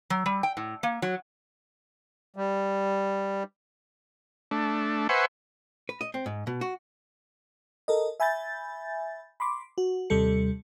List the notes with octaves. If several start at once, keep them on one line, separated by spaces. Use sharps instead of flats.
F#3
G3
G5
A2
A#3
F#3
G3
A3 D4
B4 C5 E5 F#5 G#5 C#6
B4
D#5
C4
G#2
B2
F#4
A4 A#4 D#5
E5 G#5 B5 G6 A6
B5 C6 D6
F#4
D#2 C3 G3 A4 C#7